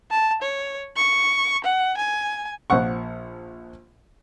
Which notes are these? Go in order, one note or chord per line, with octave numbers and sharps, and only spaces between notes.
A5
C#5
C#6
F#5
G#5
A#1 F3 F#5 C#6